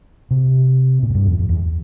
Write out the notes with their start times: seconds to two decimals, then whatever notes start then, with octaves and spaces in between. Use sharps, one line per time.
0.31 C3
1.03 A#2
1.10 A2
1.15 G2
1.27 F2
1.39 F2
1.49 E2